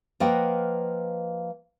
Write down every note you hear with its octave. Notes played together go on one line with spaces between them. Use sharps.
F3 A#3 B4 D#5 F#5 G5